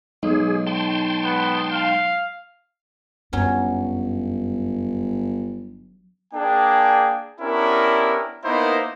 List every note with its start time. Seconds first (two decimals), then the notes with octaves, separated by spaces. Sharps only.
0.23 B1 G#3 D#4 G#4
0.67 G5 A5 C6
1.24 B3
1.72 F5
3.33 G1 F#2 F#3 C#4
6.34 A#3 D4 G#4 G5
7.41 B3 C#4 D4 E4 G4 A#4
8.44 A#3 B3 D#4 E4 A#4 C5